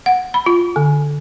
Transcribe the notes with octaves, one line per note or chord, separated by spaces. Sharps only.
F#5
B5
F4
D3